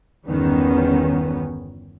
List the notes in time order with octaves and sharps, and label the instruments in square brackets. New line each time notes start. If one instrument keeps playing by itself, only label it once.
[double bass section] G1 E2 D#3 B3 C#4